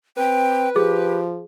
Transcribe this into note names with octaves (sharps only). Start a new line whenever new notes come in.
C4 B4 G5
F3 G4 G#4